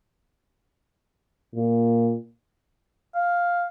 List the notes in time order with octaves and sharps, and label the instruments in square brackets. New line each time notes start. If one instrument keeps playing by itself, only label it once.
[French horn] A#2
[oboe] F5